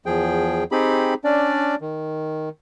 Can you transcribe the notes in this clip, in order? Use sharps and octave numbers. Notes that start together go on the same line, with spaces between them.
E2 F3 G#4 G5
C4 D#4 G4 G#4 B5
C#4 D4 D5
D#3